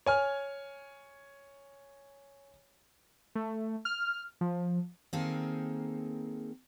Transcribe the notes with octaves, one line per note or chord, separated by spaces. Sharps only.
C#5 G#5 F6
A3
F6
F3
D#3 A#3 C4 G#4 A4